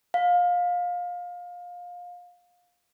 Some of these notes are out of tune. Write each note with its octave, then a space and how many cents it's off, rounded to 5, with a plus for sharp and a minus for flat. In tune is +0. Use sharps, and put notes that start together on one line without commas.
F5 +25